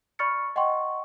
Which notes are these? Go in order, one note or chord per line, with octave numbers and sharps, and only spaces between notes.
D5 B5 C#6 F6 A6 C#7
D#5 F#5 G5 C6 C#6